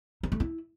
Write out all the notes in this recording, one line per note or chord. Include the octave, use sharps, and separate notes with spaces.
D#4
A3
E4